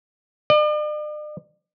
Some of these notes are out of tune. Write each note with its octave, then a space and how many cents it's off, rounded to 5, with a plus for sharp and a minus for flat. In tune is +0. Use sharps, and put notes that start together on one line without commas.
D5 +45